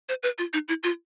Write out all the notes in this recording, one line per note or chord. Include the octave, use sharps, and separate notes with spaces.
C5
B4
F4
D#4
E4
F4